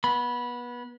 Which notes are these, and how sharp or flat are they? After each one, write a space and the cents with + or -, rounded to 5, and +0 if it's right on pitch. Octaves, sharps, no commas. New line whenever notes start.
B3 -25 B5 -10